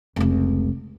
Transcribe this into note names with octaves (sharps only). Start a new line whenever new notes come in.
F1 C#2